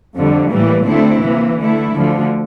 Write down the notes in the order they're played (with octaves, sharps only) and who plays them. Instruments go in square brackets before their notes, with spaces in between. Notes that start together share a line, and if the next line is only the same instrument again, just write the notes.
[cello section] F2 D3 G3
A2 E3 G3 A#3
D2 D3 A3 C4 E4
C3 E3 A#3
D3 A3 E4
D2 D3 F3